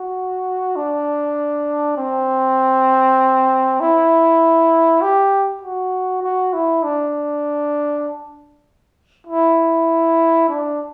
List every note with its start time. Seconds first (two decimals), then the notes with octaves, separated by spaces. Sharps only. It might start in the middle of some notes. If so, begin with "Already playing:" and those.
Already playing: F#4
0.76 D4
1.97 C4
3.80 E4
5.02 G4
5.62 F#4
6.22 F#4
6.53 E4
6.83 D4
9.27 E4
10.49 D4